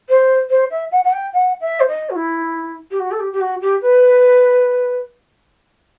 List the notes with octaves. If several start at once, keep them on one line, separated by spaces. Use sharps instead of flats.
C5
C5
E5
F#5
F#5
G5
F#5
E5
C5
D#5
F#4
E4
G4
F#4
A4
G4
G4
F#4
G4
B4